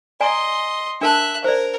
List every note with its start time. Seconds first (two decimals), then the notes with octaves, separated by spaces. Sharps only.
0.20 D5 D#5 G#5 A#5 C6
1.01 D4 A#4 E5 A5 F#6
1.44 A#4 C5 D5